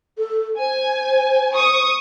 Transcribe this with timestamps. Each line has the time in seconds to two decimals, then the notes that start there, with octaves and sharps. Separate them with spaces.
0.18 A4
0.59 C5 G#5
1.56 C#6 D#6